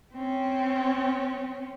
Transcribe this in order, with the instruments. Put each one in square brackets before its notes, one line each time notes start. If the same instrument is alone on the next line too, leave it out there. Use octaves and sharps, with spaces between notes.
[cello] C4 C#4